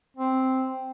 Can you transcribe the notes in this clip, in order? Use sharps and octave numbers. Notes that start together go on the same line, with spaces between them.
C4